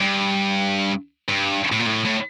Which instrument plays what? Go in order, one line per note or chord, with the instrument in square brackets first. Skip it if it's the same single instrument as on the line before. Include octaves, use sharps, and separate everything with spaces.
[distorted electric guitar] G2
G2
A2
A#2
A2
A2